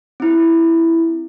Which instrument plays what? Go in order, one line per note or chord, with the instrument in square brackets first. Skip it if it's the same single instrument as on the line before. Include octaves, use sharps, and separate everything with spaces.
[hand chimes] C4 E4